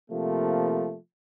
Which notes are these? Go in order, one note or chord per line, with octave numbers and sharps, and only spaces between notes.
C3 F3 A3 A#3